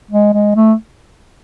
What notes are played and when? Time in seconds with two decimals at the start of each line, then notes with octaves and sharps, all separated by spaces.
0.11 G#3
0.34 G#3
0.56 A3